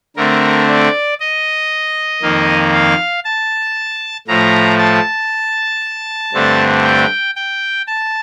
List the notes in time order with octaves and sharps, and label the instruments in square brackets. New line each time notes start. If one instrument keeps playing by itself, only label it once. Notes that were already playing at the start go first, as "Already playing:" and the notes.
[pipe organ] D3 A3 C4 A#4
D5
D#5
F2 D#3 A#3
F5
A5
A2 F3 A3 A#5
A5
G2 D3 A3 C4
G5
G5
A5